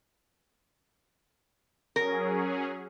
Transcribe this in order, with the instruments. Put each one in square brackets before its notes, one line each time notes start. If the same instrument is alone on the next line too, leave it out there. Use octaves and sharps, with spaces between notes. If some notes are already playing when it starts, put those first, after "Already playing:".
[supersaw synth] F#3 C#4 G#4 [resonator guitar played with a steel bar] A#4